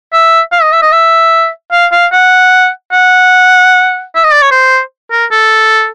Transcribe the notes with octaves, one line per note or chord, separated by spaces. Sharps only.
E5
F5
D#5
E5
D#5
E5
F5
F5
F#5
F#5
E5
D#5
D5
C#5
C5
A#4
A4